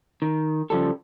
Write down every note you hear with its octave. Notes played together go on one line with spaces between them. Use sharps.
D#3
C#3 F3 G3 A4